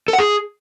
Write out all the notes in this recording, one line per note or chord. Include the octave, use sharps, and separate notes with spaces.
A4
F#5
G#4